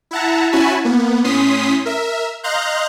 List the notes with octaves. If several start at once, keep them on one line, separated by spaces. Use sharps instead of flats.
E4 E5 F#5 A5 A#5
C#4 E4 F#4 G#5 A5 B5
A#3 B3
A2 C#4 C6 D#6 B6 C7
A#4 E5
D#5 F5 A#5 C6 F#6 G6